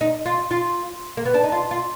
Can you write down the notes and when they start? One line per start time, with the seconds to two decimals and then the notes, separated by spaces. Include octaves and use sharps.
0.01 D#4
0.26 F4
0.51 F4
1.17 A#3
1.25 B3
1.34 D4
1.44 D#4
1.52 F4
1.71 F4